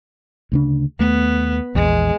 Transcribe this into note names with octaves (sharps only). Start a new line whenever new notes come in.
D2 C#3 D4
D#2 A3 B3
A#1 E2 G#3